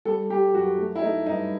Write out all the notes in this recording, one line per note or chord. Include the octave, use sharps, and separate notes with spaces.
G3 A4
G3 G4
F#2 F#4
A3
E4
A3 D#4
G2 D#4